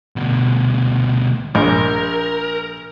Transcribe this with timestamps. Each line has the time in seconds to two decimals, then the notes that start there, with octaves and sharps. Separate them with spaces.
0.16 D2 B2
1.55 A#1 A#4